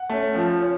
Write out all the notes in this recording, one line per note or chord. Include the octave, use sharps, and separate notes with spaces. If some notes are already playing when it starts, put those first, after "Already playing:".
Already playing: F#5
A3 C#4
F3
C#4